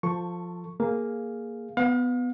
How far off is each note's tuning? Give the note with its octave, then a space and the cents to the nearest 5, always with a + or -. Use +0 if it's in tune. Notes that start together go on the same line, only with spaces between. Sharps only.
F3 +5 A4 +15 C#6 +0
A#3 +0 G#4 +0 F5 +0
B3 +10 F5 +40